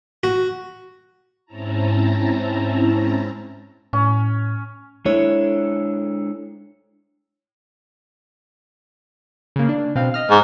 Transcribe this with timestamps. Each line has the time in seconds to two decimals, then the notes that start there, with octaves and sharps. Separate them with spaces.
0.23 F#4
1.46 G#2 C4 C#4 E4 A5 A#5
3.93 A2 C#4
5.05 G#3 D4 E4 A4 C#5
9.56 C#3 A#3
9.69 D4
9.95 B2 C4 F5
10.14 D#5 F6
10.30 G#2